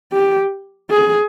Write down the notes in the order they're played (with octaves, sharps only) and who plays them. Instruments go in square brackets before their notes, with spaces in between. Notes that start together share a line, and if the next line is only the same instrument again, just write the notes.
[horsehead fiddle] G4
G#4